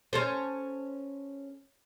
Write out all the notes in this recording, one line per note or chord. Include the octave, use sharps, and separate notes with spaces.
C#4 A4 C5